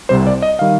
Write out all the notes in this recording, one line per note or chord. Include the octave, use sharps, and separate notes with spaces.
C2 C3 G3 C5
D5
D#5
D#3 G3 F5